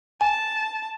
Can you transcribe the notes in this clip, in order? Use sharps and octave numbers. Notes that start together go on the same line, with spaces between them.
G#5 A5